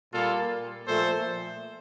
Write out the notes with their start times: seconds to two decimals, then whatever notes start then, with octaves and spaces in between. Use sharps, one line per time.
0.13 A#2 G3 A#3 F4 A4
0.87 A#2 F3 A3 A4 C5